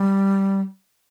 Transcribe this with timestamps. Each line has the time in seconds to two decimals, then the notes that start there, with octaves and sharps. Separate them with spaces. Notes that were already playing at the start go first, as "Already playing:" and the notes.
Already playing: G3